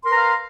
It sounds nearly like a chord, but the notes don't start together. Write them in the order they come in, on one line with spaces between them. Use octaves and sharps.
C6 A#4 B4 A#5 F5